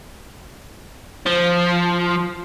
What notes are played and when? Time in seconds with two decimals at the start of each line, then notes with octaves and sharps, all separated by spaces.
1.26 F3